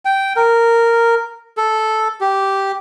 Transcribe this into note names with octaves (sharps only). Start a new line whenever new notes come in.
G5
A#4
A4
G4